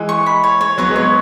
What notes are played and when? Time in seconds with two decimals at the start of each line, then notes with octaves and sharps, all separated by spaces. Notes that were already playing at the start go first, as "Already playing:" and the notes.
Already playing: E3 G#3
0.09 C#6
0.26 B5
0.44 C#5
0.61 C#5
0.78 F#3 B3 C#5
0.90 G#3
0.95 F#3 B3 C#5